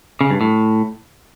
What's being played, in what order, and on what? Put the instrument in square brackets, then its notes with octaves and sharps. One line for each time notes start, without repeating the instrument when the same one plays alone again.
[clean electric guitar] C#3
G2
A2